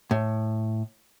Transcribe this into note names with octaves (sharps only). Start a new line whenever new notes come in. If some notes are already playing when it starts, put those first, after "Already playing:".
A2